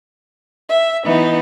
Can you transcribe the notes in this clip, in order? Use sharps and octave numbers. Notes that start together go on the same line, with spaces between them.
E5
E3 B3 D#4